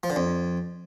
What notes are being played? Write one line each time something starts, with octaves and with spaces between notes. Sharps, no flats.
F3
D3
F2